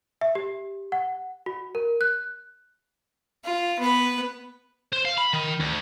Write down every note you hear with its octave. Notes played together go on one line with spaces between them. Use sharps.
E5
G4
F#5
F#4
A#4
F#6
F4
B3 B4
C5
F5
B5
D#3
D2